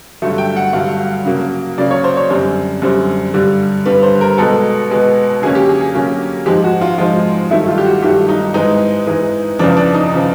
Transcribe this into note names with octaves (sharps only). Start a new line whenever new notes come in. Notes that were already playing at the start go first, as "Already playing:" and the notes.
G2 D3 F#3 A3
G5
F#5
G2 D3 F#3 A3 F5
C#3 F#3 A#3
C#3 F#3 A#3 D5
C#5
C5
C#5
F#2 D3 G3 C4 C5
F#2 D3 G3 C4
G2 D3 G3
G2 D3 G3 B4
C5
A#4
B2 G#3 B3 A4
B2 G#3 B3
D3 F#3 A#3 C#4 G#4
G4
G#4
G#4
D3 F#3 A#3 C#4
G#2 F3 G#3 G4
F#4
F4
G#2 F3 G#3 F4
G2 D#3 F#3 A3 E4
F4
G4
F#4
G2 D#3 F#3 A3 G4
D#4
G#2 E3 G#3 D#4
G#2 E3 G#3
E2 C#3 F3 D4
D4
D#4
C#3 F3